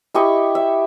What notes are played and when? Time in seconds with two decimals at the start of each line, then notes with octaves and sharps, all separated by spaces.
0.14 E4 G4 D#5 C#6
0.55 E5